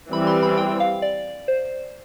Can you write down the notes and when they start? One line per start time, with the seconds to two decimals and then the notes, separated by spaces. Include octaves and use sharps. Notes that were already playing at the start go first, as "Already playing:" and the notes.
0.12 E3 G3 C4 B5
0.27 C6
0.43 B5
0.57 G5
0.80 F5
1.02 D5
1.48 C5